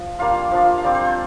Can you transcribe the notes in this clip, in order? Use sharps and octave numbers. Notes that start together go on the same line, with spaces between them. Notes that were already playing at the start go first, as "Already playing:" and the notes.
Already playing: F3
G3 A#3 D4 F4 F5
F3 D4 F4
F5
G3 C4 F4 D5
C5
C5